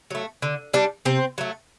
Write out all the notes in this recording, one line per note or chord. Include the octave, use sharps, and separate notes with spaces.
F#3 A3
D3
G3 D4
C3 C4
F#3 A3